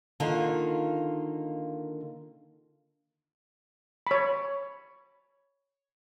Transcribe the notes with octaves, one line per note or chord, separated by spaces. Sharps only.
D3 D#3 A#3 D#4 F4
C#5 B5